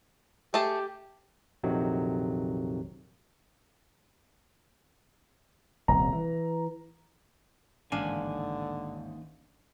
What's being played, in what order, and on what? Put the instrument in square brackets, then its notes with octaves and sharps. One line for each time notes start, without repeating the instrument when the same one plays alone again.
[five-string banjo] A3 G#4 A5 [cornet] G4
[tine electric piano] A#1 F2 C3 D#3 F#3
[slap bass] D#1 C2 [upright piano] A#5
[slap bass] E3
[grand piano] A1 G#2 [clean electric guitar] D#2 G#5 [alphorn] D3 [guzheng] D4 F5